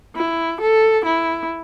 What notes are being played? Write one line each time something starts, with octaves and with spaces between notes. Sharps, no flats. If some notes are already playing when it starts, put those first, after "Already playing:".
E4
A4
E4